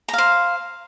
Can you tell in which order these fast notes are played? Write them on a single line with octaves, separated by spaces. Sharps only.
A#5 F5 C5